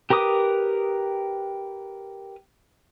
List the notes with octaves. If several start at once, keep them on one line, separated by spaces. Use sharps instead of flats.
G4 A#4 B4 D6 D#6